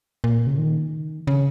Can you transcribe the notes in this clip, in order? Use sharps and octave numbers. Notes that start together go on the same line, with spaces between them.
A#2
C#3
D#3
C#3